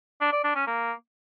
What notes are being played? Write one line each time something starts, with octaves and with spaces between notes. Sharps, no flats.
D4
D5
D4
C#4
A#3